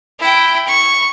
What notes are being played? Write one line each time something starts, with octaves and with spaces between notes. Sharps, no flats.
E4 G5
C#6